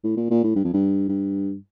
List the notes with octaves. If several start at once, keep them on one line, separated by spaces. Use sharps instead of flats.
A2
A#2
A#2
A2
G2
F2
G2
G2